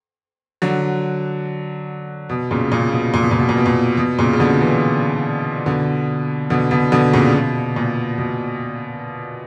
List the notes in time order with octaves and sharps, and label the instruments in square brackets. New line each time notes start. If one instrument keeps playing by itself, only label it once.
[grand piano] D3 F#3
B2
A#2 C#3
A#2 C#3
B2
A#2
B2
A#2
B2
A#2
B2
A#2
B2
A#2 C#3
C#3
B2 D3
C#3 E3
B2 D3
B2 D3
B2 D3
B2 D3
A#2 C#3
B2
A#2
B2